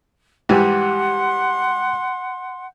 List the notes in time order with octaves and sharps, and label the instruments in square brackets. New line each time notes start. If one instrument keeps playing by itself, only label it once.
[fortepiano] G#2 E3 G3 [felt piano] G4 [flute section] F#5 C6